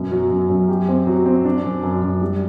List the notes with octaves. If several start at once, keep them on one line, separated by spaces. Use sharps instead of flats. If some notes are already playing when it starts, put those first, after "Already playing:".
Already playing: F#2 B2
F#3
F#2
F#2
G4
C4
F#3
C4
D4
F#2
F#2
F#2
G3